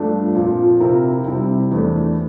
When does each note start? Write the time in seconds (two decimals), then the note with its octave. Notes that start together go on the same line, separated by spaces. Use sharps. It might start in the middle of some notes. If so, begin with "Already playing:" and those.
Already playing: G2 F3 A3 D4
0.35 A#2 F3 C4 F4 C5
0.80 C3 F3 C4 E4 A#4
1.25 C3 G3 C4 E4
1.71 E2 E3 A3 D4